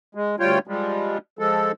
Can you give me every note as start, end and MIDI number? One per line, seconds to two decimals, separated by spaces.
0.15 0.36 56
0.40 0.59 38
0.40 0.59 55
0.40 0.59 65
0.40 0.59 73
0.40 0.59 79
0.67 1.18 53
0.67 1.18 55
0.67 1.18 56
1.39 1.72 53
1.39 1.72 56
1.39 1.72 69